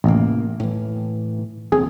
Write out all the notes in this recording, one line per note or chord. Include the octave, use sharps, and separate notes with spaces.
A1 E2 C3 A#3
A2 E3
E1 D#2 C4 G#4